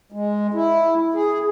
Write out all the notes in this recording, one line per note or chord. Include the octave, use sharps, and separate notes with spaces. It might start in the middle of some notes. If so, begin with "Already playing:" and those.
G#3
E4
G#4